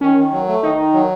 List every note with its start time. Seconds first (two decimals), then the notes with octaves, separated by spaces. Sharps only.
0.01 D#3 C#4
0.17 D#3
0.32 F#3
0.47 A3
0.63 D#3 D#4
0.78 D#3
0.93 F#3